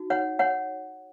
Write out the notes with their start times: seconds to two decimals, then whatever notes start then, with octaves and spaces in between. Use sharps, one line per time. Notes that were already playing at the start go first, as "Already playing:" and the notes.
Already playing: D#4 F#4
0.10 C#5 F#5
0.39 C#5 F#5